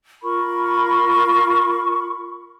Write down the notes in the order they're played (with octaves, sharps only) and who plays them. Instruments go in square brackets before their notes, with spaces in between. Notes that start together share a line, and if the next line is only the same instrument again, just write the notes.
[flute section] F4 A#4 B5 C#6